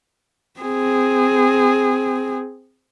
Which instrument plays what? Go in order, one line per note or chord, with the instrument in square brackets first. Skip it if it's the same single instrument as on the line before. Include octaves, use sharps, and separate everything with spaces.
[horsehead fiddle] C4 G#4